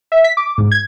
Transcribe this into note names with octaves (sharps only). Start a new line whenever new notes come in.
E5
B6
D6
G#2
G#6